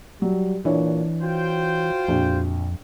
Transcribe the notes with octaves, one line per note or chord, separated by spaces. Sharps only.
F#3 G3
A#2 E3 D4 C#5
F4 F#4 C5 G5
A#1 F2